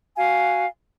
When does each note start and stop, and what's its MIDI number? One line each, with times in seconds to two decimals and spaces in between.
0.17 0.66 66
0.17 0.66 77
0.17 0.66 80